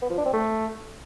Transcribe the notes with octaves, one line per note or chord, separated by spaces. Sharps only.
B3
F3
D4
C4
A3